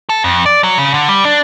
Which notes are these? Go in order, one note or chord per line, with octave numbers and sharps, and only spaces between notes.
A4
F2
D5
F#3
C#3
D3
G3
D4